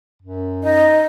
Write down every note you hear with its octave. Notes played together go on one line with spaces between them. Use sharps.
F#2
D#4 D#5